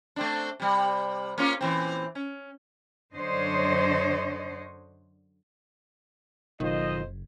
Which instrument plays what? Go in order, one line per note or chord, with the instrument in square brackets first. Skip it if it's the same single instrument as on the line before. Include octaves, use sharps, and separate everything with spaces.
[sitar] A3 C4 D4
C3 G3
A#3 C#4 F4
A#2 E3 C4
C#4
[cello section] F#2 D3 D4 C5 C#5 D#5
[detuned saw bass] F#1 [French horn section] F2 C5 D#5 [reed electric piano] B2 F#3 F4 [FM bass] D#3